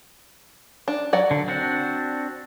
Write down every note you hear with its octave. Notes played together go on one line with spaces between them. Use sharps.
D4
F#3 D5 F#5
D3
C4 D4 F#4